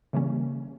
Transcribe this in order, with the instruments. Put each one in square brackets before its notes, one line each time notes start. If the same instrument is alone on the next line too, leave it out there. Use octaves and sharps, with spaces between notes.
[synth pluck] C#3 E3 G3 A#3 C#4